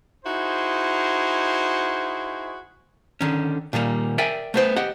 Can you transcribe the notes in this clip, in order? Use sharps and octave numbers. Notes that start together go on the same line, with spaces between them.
D#4 E4 F#4 G#4 C5
D3 D#3 C#4
A#2 D#3 G3 A#3
A#4 D5 E5 G5 G#5
A3 B3 C5
G4 D#5 F#5